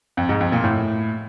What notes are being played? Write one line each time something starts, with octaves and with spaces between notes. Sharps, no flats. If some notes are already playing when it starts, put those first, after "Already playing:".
F2
G#2
F2
A#2
A2